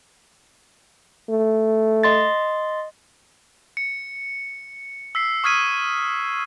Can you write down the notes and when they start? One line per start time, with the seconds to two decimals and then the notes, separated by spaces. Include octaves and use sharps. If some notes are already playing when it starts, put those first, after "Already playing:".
1.30 A3
2.03 D#5 C6 A6
3.77 C#7
5.15 E6 B6 C7
5.44 C#6 D#6 F6 G#6 B6 D#7